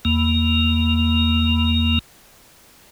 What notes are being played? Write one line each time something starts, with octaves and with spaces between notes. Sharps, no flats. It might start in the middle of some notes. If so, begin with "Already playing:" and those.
E2 A#3